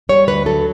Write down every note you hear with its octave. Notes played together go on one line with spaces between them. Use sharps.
G3 C#5
D2 B4
F#3 A4